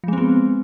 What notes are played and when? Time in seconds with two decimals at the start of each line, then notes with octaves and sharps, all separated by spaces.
0.04 F3
0.08 G#3
0.13 C4
0.18 B3